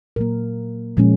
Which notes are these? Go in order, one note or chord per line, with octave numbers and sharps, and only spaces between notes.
A#2 F#3 A#3 A#4
A#2 F3 G#3 C#4